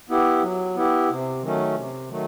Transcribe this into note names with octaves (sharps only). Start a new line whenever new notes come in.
B3 E4 G4
F#3
B3 E4 G4
C3
D#3 F#3 A3 C#4
C3
D#3 F#3 A3